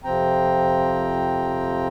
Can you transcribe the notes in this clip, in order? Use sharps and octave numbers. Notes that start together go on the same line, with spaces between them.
F2 C3 F3 C4 G5 A#5